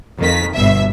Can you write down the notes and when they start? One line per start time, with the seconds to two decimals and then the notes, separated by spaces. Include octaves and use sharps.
0.18 F2 D#3 B6
0.54 G1 G2 B2 E5